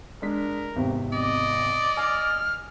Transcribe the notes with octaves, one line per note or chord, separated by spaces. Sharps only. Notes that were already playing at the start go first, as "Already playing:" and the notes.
G#3 D4 A#4 B6
G#1 E2 C3
D5 D#5
G#5 F6